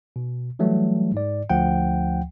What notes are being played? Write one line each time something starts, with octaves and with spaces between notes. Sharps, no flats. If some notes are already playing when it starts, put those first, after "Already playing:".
B2
E3 F#3 G3 A3
G#2 D5
D2 F3 F#5 G5